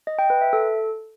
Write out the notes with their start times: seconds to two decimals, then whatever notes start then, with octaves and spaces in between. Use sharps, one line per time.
0.07 D#5
0.19 G5
0.30 B4
0.41 E5
0.53 A4